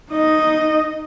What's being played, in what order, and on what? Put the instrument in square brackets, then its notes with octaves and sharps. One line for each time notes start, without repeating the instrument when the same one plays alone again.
[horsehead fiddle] D#4 D#5